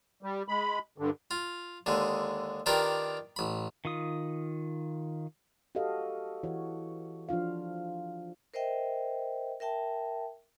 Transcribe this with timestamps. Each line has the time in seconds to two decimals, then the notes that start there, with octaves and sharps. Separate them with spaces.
0.23 G3
0.48 G#3 B5
0.98 G2 D3
1.31 F4
1.86 D#2 D3 G#3
2.66 D#3 D4 F4 G4 A#4 B4
3.36 A1 B5
3.85 D#3 F4 D#6
5.75 F#4 G4 A4 D#5 F5
6.43 E3 F#4 C#5
7.29 F3 D4 F4 F5
8.54 A#4 C5 D#5 E5 G5
9.60 A#4 E5 G5 A5